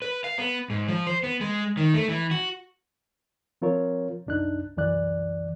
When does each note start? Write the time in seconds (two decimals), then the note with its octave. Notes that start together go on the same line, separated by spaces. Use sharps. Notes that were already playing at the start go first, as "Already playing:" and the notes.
0.02 B4
0.24 F5
0.38 B3
0.70 G#2
0.88 F3
1.07 C5
1.24 B3
1.41 G#3
1.77 D#3
1.94 A3
2.08 E3
2.31 F#4
3.62 F3 C4 F4 A#4 C#5
4.26 C2 F#2 D4 D#4 F#6
4.77 C2 F#2 E3 D5 F#6